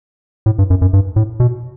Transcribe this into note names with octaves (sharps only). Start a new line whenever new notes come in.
A2
G2
F#2
F#2
G2
A2
B2